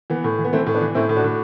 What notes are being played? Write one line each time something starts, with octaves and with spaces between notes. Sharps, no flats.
E3 B3
A2
E3
B3
E3 A3 C4
A2
B3 D4
E3
A2 C4 E4
A2
D4 F#4
A2